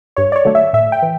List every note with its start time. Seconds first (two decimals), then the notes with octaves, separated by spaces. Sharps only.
0.17 G2 C#5
0.32 D5
0.36 C#5
0.45 D3 F#3 A3
0.55 E5
0.73 A2 E5
0.92 G5
1.02 E3